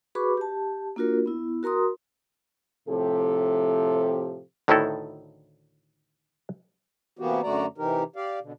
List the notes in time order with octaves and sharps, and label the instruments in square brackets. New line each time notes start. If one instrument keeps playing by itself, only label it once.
[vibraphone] F#4 G#4 B4 B5 C#6 D6
G4 A5
A#3 D4 F4 F#4 A#4
B3 E4
F#4 A#4 A#5 C6 D#6
[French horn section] A2 C3 F3 G4 A4
[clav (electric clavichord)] D2 A2 D#3 D#4 E4 A4
[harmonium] C3 E3 A#3 B3 F#4 G4
F#2 D3 A3 F#4 D5 A#5
C3 E3 D#4 G4 A#4
G4 D5 F5
B2 D3